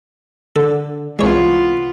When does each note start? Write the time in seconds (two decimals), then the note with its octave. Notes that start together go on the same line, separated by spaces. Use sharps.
0.56 D3 A4
1.19 C2 E3 G#3 B3 F4 C#5